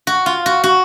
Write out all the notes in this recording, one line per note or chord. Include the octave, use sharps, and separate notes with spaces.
F#4
F4
F#4
F#4